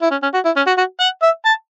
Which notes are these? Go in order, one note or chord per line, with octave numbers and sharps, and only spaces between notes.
E4
C#4
C#4
F#4
E4
C#4
F#4
F#4
F#5
E5
A5